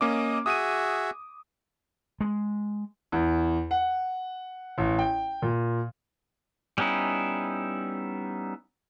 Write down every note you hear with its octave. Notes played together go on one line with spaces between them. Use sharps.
A#3 C#4 D#5 D6
F#4 G#4 E5 D#6 D#7
G#3
E2
F#5
A1
G5
A#2
G3 B3 C#4 D#4 E4